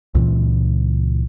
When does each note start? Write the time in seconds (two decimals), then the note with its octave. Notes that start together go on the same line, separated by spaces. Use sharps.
0.15 C#2 A#2 E3